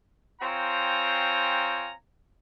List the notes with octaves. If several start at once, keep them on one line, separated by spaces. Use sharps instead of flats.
C4 F4 C#5 G5 G#5 A#5